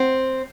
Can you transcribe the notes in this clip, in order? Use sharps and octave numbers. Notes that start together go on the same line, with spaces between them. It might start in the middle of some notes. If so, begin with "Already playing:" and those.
Already playing: C4